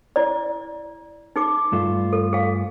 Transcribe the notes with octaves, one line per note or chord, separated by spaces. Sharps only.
E4 D5
D#4 G#4 D6
G2 A3 F4
A4
G#4 F5